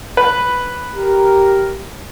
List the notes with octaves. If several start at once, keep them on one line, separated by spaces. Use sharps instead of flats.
B4
G4 A#4